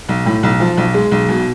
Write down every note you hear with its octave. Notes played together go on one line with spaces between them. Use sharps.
B1
A2
B1
F3
B1
G#3
B1
B2